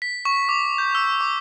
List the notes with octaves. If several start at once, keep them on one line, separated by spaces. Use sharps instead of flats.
B6
C#6
D6
G6
E6
D6